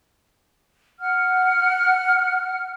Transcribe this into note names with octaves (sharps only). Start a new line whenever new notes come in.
F#5 F6